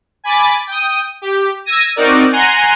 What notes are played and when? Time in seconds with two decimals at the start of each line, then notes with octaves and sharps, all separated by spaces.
0.24 G#5 B5 D6 A6
0.67 G5 D#6
1.22 G4
1.65 E6 G#6 A#6 D#7
1.96 C4 D#4 F#4 A#4 D5
2.32 F#5 G#5 A#5 C6